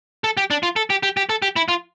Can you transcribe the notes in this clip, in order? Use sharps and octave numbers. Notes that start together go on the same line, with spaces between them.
A4
G4
D4
F4
A4
G4
G4
G4
A4
G4
E4
F4